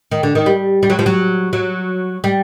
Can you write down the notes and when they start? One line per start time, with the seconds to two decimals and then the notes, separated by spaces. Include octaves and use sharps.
0.11 D#3
0.23 D3
0.35 D#3
0.46 G3
0.83 G3
0.90 F#3
0.99 F3
1.06 F#3
1.53 F#3
2.24 G3